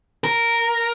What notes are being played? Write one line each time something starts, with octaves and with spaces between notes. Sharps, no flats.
A#4